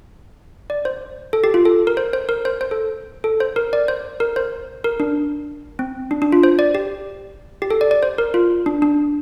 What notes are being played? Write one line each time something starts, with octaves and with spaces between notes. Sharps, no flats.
D5
C5
A4
G4
F4
A4
A#4
C5
C5
A#4
C5
C5
A4
A4
C5
A#4
D5
C5
A#4
C5
A#4
D4
C4
D4
D4
F4
C5
D5
G4
G4
A4
D5
D5
C5
A#4
F4
D4
D4